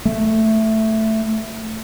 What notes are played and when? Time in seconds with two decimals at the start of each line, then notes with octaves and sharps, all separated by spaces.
0.05 A3